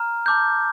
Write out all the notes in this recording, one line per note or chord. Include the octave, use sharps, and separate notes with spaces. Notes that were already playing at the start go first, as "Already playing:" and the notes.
Already playing: A#5 F6
A5 D6 G6